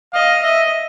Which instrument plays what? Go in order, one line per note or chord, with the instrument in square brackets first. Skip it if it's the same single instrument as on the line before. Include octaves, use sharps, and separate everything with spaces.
[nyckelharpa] D#5 [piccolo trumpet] F5
[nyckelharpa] D#5 [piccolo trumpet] E5